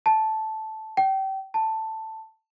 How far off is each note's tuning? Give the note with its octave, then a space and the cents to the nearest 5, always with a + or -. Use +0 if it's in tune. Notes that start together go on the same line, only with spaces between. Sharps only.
A5 -10
G5 -30
A5 +5